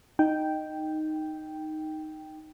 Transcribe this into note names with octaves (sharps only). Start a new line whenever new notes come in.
D#4 G5